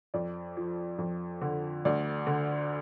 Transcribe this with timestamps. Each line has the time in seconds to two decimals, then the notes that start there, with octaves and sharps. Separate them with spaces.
0.14 F2 D5
0.57 F3
0.98 F2
1.42 D3
1.85 D2 D5
2.27 D3